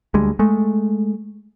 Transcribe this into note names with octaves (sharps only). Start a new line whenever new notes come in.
D2 G3 G#3
G#3 A3